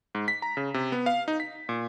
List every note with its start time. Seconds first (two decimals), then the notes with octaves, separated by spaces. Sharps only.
0.15 G#2
0.28 B6
0.42 A#5
0.57 C#3
0.74 C3
0.92 B3
1.06 F5
1.28 D#4
1.40 B6
1.69 A#2